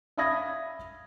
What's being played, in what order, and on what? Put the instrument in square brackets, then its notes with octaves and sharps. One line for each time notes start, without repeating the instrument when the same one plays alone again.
[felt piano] E5 F5 B5 D#6 G#6 A#6